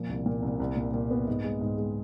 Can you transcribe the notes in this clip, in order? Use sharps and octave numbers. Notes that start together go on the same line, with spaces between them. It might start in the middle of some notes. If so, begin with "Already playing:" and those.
Already playing: A#2 F3
C2
A#2
C2
C2
A#2
A#2
B3
G#2
G#3
G#2
G#3